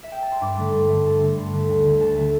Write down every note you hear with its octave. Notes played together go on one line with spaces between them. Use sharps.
E5
G5
A5
C6
G2 D6
D3 A3
G2 C6
D3 A3
G2 A5
D3 A3 C6
G2 C6
D3 A3
D2
D3 A3
D2 A5
D3 A3